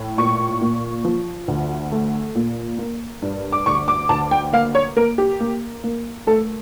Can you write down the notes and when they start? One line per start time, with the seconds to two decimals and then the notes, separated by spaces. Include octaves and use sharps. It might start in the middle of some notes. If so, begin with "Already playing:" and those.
Already playing: A2
0.18 A#2 C#6
0.61 A#2
1.05 F3
1.48 D2
1.92 A3
2.35 A#2
2.78 A#3
3.22 G2
3.52 D6
3.66 D2 C#6
3.88 D6
4.09 D2 A5
4.31 G5
4.53 A#3 F5
4.75 C#5
4.96 A#3 A#4
5.18 G4
5.40 A#3
5.84 A#3
6.27 A3 A4